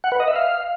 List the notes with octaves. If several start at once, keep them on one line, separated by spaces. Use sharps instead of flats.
F#5
B4
D#5
E5
F5